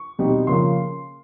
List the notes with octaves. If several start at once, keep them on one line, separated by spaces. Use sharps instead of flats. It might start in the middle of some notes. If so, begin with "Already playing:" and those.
Already playing: C#6
B2 G3 C4 D#4
C#3 F3 A#3 C6